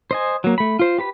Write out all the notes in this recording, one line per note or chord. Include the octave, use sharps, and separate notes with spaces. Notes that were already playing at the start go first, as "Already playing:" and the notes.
C5 D#5 G#5
F#3 A#3
A3 B5
F4 C5
G4 B4 B5